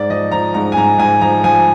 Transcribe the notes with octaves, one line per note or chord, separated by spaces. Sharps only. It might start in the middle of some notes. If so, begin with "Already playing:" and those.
Already playing: G#2 D5
F3 D#5
F3 A#5
G#2 A#5
G#5
G#2 A#5
G#2 G#5
F3 A#5
F3 G#5